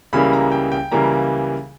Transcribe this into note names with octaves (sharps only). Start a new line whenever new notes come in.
C#2 C#3 E3 G3 A#3 B5
A#5
G5
G5
C#2 C#3 E3 G3 A#3 A#5